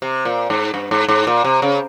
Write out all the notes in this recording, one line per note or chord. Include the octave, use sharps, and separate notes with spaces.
C3
A#2
G#2
G2
G#2
G#2
A#2
C3
C#3